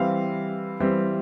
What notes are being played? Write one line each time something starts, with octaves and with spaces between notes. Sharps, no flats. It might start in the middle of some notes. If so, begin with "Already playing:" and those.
Already playing: E3 G3 C4 F5
E3 G3 C4